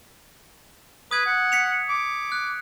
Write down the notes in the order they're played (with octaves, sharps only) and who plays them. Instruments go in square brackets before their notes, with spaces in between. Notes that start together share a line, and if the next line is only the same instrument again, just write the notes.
[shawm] B4 [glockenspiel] D#6 G#6
[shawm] F#5
[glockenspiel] B6 C#7 F7
[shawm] D6
[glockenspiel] F#6